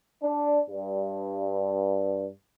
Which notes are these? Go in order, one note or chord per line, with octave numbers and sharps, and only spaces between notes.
D4
G2